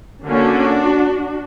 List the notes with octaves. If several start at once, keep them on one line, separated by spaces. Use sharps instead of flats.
D3 A#3 C#4 D4 F#4